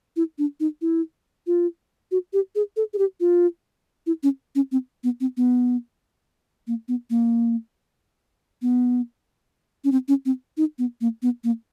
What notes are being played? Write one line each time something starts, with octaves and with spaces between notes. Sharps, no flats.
E4
D4
D#4
E4
F4
F#4
G4
G#4
A4
G#4
G4
F4
E4
C#4
C#4
C4
B3
C4
B3
A#3
B3
A#3
B3
C#4
C4
C#4
C4
D#4
B3
A#3
B3
A#3